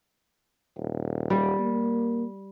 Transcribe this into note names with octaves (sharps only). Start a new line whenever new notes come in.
D#1
G3
A#3